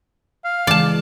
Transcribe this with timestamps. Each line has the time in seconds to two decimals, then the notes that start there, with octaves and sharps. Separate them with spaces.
0.44 F5
0.67 C#3 E3 G#3 D5 A5